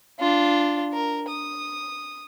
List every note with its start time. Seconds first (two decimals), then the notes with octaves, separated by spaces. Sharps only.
0.19 D4 F4
0.93 A#4
1.29 D#6